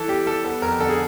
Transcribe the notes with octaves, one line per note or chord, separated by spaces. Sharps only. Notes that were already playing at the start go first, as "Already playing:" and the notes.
Already playing: E3 A4
G3 G4
G3 A4
B3 A4
F2 A#4
D3 A4
G#4